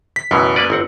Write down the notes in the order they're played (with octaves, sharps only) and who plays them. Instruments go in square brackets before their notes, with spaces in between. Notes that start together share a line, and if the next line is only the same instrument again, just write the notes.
[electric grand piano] B6
[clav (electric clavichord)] C#2 B2 E3 [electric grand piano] F#2
[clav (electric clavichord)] A#3 B4 D5
G1 C4 F#5